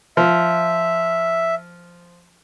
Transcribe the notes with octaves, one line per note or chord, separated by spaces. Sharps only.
F3 E5